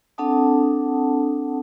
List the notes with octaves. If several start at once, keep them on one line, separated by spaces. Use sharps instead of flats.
C4 D4 A4 F#5 A5 D#6